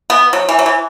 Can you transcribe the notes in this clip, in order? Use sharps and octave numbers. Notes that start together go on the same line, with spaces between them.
B3
F#3
E3
F#3
E3